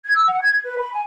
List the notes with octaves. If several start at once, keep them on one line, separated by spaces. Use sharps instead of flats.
G#6
E6
F#5
G#6
B4
B5
G#5